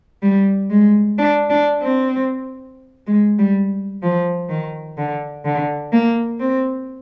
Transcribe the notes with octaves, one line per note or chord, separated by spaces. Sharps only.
G3
G#3
D4
D4
C4
G#3
G3
F3
D#3
D3
D3
A#3
C4